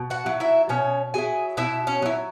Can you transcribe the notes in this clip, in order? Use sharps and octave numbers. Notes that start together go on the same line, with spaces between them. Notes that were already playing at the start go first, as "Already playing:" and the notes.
Already playing: B2
F#4 F#5
F#3 E4
E4 E5
B2 C#4 C#5
F#3 E4 G#4 G#5
B2 E4 E5
C#4 C#5
F#3 E4